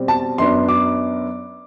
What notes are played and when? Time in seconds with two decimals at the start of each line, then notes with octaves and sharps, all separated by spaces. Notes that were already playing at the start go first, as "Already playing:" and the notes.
Already playing: B2 G3 C4
0.08 A5
0.38 F#2 F#3 B3 D4 C6
0.69 D6